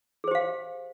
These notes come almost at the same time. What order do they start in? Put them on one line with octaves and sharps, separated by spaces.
G#4 C5 G4 F5